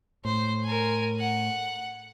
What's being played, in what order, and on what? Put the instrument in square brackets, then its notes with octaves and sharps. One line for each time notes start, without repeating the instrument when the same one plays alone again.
[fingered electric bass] A2 [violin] C5
[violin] A#4 G#5
F#5